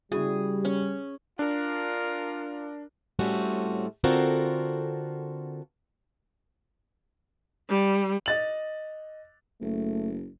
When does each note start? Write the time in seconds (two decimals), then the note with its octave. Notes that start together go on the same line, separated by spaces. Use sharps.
0.12 C#3 G3 E4 F#4 G#4
0.65 C#4
1.39 D4 F4 A#4
3.19 A2 G3 A3 C4 C#4 F#4
4.04 D3 C4 F4 F#4 A4 A#4
7.69 G3
8.26 D#5 A6 F#7
9.61 F#1 A3